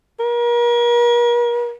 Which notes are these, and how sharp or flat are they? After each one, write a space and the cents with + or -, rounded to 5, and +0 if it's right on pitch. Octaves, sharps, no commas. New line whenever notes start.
A#4 +40